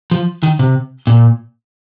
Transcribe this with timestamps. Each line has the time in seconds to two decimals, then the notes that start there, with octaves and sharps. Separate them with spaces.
0.11 F3
0.43 D#3
0.59 C3
1.07 A#2